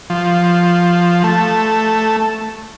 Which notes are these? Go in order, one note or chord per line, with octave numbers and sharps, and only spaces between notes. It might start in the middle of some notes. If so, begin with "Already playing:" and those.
F3
A3